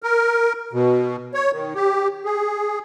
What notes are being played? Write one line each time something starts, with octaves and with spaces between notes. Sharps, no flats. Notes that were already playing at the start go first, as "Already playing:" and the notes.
A#4
B2
C#5
D#3
G4
G#4